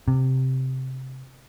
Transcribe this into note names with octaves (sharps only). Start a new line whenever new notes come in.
C3